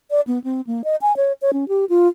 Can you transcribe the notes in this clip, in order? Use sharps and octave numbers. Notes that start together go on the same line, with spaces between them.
D5
B3
C4
A#3
D#5
G#5
C#5
C#5
C#4
G4
F4